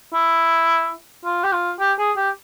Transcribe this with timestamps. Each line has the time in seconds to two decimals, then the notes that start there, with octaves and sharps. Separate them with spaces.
0.14 E4
1.25 F4
1.43 G4
1.52 F4
1.79 G4
1.99 G#4
2.17 G4